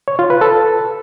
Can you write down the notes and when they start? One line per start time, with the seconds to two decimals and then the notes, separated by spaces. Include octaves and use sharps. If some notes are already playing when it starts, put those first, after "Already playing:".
0.08 C#5
0.19 F4
0.30 B4
0.41 A4